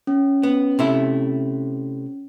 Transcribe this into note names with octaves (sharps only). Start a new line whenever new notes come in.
C#4
B3
C3 A3 E4